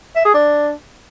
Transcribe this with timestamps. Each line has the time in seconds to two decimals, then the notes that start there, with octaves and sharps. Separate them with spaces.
0.16 E5
0.25 G#4
0.34 D4